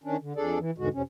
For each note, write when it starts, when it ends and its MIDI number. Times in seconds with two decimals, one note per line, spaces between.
0.04 0.17 51
0.04 0.17 61
0.04 0.17 62
0.21 0.33 50
0.36 0.58 41
0.36 0.58 62
0.36 0.58 68
0.36 0.58 69
0.36 0.58 74
0.59 0.71 52
0.78 0.89 40
0.78 0.89 44
0.78 0.89 47
0.78 0.89 50
0.78 0.89 56
0.78 0.89 66
0.94 1.02 41
0.94 1.02 48
0.94 1.02 61